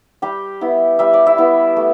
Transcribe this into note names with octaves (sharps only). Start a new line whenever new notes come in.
G3 G4 G5
B3 E4
G3 E5
D5
E4 E5
B3 E4
A3